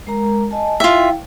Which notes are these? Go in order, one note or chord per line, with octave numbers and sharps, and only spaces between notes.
G#3 A#4 A#5
D#5 G#5 A5
E4 F4 E5 F5 G5